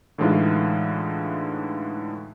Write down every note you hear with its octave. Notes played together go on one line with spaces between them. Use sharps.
A2 D3 E3 G#3 D#4 F4